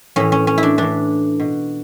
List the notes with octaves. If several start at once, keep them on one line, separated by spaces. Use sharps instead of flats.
A2 E3 C#4
C#4
C#4
E4
D4
A2 E3 D4
B2